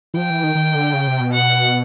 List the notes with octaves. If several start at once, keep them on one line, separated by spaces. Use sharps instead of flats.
E3
F3 G5
E3
D#3
D#3
D3
C#3
C3
B2
F#5